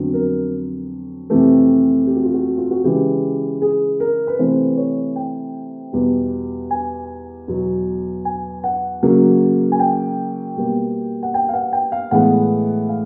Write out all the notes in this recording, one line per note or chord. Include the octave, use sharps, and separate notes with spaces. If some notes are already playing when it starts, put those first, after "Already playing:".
Already playing: F2 D3 F#3 B3
A#4
F2 C3 E3 A3 G4
G4
F#4
F4
F#4
F4
F#4
C#3 E3 G#3 G4
G#4
A#4
B4
C3 E3 A3 C5
C#5
G5
E2 B2 G3
G#5
E2 B2 F#3
G#5
F#5
C#3 F#3 A#3
G#5
G5
B2 G3 A#3
F#5
G5
F5
F#5
G5
F5
A2 E3 G#3 B3 F#5
F5